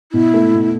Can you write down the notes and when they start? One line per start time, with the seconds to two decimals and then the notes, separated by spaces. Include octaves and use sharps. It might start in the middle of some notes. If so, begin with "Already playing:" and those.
0.12 B2 E4
0.34 A3
0.54 B2